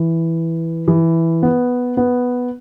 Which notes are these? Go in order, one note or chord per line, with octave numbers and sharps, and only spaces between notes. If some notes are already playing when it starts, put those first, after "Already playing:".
Already playing: E3
E3
B3
B3